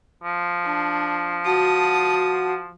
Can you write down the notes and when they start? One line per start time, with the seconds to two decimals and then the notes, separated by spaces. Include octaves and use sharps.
0.24 F3
0.65 D4
1.45 F#4 A5 D#6